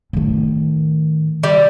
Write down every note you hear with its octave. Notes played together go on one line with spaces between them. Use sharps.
A2 D#3
G3